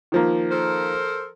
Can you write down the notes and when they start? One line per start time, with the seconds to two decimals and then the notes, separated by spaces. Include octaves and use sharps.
0.12 D#3 F3 A#3
0.51 A4 A#4 C5